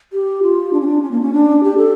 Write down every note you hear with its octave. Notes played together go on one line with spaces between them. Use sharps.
G4
F4
D4
C#4
D4
C#4
A#3
C#4
D4
G4
A4